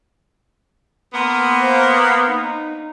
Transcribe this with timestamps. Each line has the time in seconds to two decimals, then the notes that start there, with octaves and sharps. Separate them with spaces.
1.14 A#3 B3 C6 D#6
1.59 C5 F5
2.26 D#4